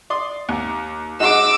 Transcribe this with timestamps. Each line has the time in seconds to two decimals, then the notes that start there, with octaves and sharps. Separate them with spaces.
0.10 D5 C6 D#6
0.49 D#2
1.20 G#3 D#4 F#4 D6 E6